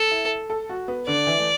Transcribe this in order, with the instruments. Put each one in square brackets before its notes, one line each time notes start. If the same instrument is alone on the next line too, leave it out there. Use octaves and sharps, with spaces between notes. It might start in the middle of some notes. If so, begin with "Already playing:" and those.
Already playing: [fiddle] A4
[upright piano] E4
A4
F#4
B3
[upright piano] D3 [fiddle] D5
[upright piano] E3
A3